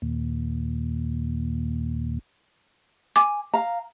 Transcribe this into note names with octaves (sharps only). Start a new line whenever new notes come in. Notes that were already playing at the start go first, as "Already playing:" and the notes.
D#2 A#2
G#5 D6
F5 A#5